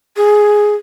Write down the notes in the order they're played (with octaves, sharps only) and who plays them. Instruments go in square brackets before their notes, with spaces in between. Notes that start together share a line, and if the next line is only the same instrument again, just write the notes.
[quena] G#4